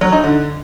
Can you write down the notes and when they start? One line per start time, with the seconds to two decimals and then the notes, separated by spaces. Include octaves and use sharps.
0.01 F#3
0.12 D#4
0.24 D3